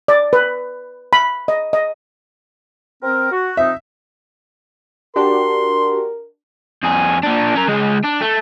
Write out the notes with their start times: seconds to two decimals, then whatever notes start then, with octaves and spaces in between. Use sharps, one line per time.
0.08 D5
0.33 B4
1.13 B5
1.48 D#5
1.73 D#5
3.03 C4 A#4
3.32 F#4
3.57 F3 C4 D#4 E5
5.16 D4 F#4 G4 A#4 C6
6.83 F2 G#4
7.23 A#2 D4
7.56 C#4 A#4
7.69 C#2 G#3
8.04 D4
8.21 A3